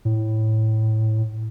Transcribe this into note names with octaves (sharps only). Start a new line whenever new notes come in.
A2